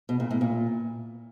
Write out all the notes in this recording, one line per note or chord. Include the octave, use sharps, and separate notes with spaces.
B2
A#2
A2
A#2